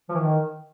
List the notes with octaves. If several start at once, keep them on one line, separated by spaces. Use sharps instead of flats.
F3
E3
D#3